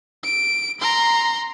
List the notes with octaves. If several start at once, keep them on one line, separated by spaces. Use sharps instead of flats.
D7
A#5 C6